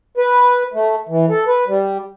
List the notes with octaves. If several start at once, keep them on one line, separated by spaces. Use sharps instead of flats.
B4
A3
E3
A4
B4
G3